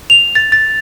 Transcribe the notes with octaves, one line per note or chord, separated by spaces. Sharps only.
F7
A6
A6